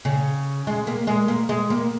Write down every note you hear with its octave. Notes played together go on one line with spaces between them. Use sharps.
C#3
G#3
A#3
G#3
A#3
G#3
A#3